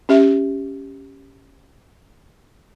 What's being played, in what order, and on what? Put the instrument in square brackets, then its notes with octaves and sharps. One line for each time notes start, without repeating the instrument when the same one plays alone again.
[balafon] C#4 G4 E5